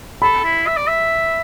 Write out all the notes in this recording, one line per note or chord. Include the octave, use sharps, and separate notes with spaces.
A4 B5
E4
E5
D5
E5